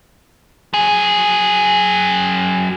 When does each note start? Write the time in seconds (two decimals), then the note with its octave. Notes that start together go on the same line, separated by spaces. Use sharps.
0.74 F#3 G#4